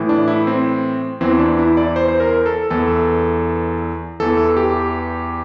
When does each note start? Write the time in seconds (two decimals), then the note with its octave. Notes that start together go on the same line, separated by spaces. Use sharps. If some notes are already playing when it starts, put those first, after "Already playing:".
Already playing: A2 E3
0.09 D4
0.28 E4
0.47 C4
1.20 E2 E3 C4
1.39 D4
1.59 E4
1.77 D5
1.96 C5
2.08 C5
2.20 A#4
2.46 A4
2.70 E2 E3 A4
4.20 E2 E3 A4
4.57 G4